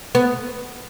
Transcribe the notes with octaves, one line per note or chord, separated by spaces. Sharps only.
B3